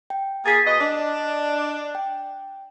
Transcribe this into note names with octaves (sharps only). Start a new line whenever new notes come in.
G5
A#3 F4 G#4 A6 B6 C7
B2 D#5
D4 D#5
G5